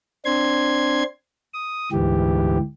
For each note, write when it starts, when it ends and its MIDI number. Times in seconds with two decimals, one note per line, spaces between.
0.25 1.03 60
0.25 1.03 62
0.25 1.03 84
0.25 1.03 92
1.54 1.89 87
1.92 2.58 38
1.92 2.58 44
1.92 2.58 52
1.92 2.58 67